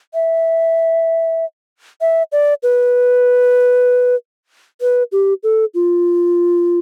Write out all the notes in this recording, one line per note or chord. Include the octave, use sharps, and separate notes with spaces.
E5
E5
D5
B4
B4
G4
A4
F4